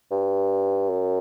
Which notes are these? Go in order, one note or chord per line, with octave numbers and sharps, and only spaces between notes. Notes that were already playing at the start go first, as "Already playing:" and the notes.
G2
F#2